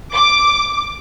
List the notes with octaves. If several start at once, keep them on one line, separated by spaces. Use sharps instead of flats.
D6